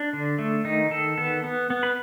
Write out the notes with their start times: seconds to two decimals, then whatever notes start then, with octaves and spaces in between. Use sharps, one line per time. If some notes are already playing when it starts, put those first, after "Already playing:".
Already playing: D4
0.13 D3
0.39 A3
0.65 D#3 D#4
0.91 D#3 A4
1.18 B3 A4
1.44 B3
1.70 B3
1.83 B4